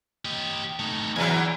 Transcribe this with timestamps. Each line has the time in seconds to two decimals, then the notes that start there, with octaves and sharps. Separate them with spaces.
0.25 G4 D#5
0.79 A3 D#4
1.16 E2 E3 F#3 E5 G#5